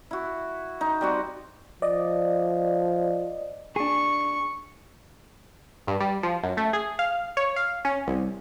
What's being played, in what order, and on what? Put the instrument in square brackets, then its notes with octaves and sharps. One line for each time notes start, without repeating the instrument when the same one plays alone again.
[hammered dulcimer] E4 F#4
D#4
G3 C4 F#4
[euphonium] F3 [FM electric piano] D5 D#5
[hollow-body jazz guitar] D4 G#4 [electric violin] C#6
[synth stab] G2
G3
F3
F#2
A3
G#4
F5
C#5
F5
C#4
C2